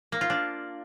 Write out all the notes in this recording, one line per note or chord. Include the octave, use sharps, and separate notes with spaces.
A#3
F4
D4